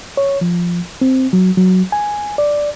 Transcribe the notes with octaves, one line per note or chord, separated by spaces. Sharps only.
C#5
F3
C4
F#3
F#3
G#5
D5